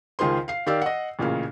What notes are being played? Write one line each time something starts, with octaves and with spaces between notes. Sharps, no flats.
C#2 D#3 F4 G#4 C5 C6
F5 C7
D#3 G4 D5 F5 E6
D#5 F#5
A1 A#2 C#3 F5